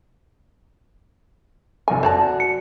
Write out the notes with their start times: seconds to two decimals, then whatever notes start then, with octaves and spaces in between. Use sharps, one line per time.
1.88 F1 F#2 D5 G#5
2.03 F#4 C5 D5 A5
2.40 C#7